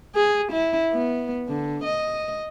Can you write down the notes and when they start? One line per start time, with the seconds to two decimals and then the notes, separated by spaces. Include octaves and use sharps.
0.16 G#4
0.52 E4
0.93 B3
1.49 D3
1.84 D#5